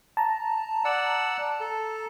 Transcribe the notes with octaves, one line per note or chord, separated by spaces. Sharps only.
A5 A#5
D5 F#5 E6
A4